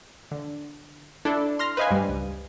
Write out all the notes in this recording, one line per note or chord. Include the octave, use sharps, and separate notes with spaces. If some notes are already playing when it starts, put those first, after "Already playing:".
D3
D4 E4 A4
C6 F6 A#6
B4 C5 D#5 F5 G#5
G2 G3
C#2